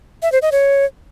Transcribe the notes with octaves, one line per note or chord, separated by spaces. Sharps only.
E5
C5
D#5
C#5